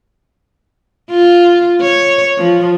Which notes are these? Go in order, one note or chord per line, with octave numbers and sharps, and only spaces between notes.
F4
C#5
F3